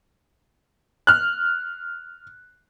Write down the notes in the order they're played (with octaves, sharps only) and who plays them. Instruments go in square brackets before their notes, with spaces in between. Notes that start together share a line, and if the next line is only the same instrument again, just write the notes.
[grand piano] F6 F#6